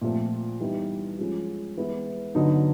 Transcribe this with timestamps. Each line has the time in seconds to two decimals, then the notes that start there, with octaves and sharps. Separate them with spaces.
0.01 A#2 F3 A3 C4
0.60 E3 G3 B3 D#4
1.19 F3 G#3 C#4
1.77 E3 G#3 B3 E4
2.35 D3 F#3 B3 D#4